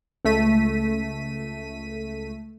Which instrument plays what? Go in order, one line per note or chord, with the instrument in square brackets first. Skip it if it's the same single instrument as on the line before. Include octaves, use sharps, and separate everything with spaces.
[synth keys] C#2 A3 B6 D#7